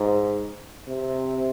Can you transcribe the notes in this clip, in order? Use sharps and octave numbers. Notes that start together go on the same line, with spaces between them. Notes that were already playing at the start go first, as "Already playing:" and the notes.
Already playing: G#2
C3